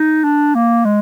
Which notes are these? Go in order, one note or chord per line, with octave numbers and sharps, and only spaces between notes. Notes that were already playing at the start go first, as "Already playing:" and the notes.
Already playing: D#4
D4
A#3
G#3